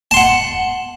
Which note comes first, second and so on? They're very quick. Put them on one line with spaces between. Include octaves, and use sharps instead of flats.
A5 C6 F#5